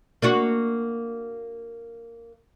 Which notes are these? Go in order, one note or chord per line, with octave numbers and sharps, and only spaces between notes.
A#3 D4 F#4